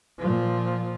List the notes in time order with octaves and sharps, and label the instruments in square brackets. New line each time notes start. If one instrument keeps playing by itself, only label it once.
[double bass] A#2 F3